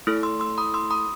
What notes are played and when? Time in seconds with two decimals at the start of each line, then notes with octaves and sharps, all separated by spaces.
0.07 A3 E4 A4
0.23 C6 E6
0.40 C6 E6
0.58 B5 D#6
0.74 C6 E6
0.91 B5 D#6